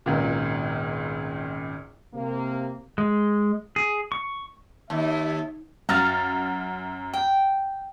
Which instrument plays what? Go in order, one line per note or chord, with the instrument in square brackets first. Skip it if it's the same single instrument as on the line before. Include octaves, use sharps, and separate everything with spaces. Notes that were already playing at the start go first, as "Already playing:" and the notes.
[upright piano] G#1 C#2 A#2
[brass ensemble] C3 A#3
[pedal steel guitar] G#3
G#4
C#6
[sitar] D#2 [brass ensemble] E5
[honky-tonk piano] F#2 F6 A6 [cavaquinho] F#4 F5 A#5
[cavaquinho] G5